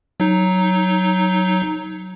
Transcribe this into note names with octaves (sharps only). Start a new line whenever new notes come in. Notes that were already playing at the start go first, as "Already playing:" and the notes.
F#3 D#4